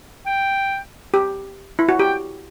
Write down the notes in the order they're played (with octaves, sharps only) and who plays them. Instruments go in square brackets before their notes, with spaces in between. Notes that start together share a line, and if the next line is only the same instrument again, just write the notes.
[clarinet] G5
[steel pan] G4
E4
F#4
[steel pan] G4 [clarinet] G5